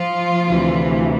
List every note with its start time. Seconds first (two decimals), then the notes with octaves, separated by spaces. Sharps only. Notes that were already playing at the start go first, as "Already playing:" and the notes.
Already playing: F3 F4
0.48 D2 C3 E3